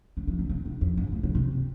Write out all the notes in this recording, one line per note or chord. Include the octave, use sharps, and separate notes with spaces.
D3
E3
D3
C3
A2
F2
G#2
A2
B2
C3